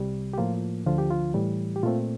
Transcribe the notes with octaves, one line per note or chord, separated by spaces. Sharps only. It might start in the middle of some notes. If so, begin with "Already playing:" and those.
Already playing: C2 C3 G3
G4
A2 F3 A#3 F4
D2 D3 F3 F4
G4
F4
A2 E3 G3
G4
A#2 A3 C4 F4